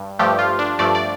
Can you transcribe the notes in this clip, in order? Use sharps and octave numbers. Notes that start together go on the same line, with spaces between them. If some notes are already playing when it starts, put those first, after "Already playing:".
Already playing: G2
G2 F3 A3 G4
F4
D4
G2 F3 A3 D5
D5